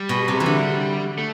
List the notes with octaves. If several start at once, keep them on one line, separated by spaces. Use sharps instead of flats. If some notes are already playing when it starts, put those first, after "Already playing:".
Already playing: G3
B2
C3
E3
D3
A3